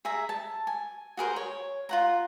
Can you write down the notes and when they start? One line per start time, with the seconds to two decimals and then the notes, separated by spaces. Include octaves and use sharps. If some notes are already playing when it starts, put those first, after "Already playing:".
0.05 G#4 E5 A#5
0.29 A5
0.67 G#5
1.17 F#4 G#4 A#4 C5
1.36 C#5
1.89 F4 F#5 A#5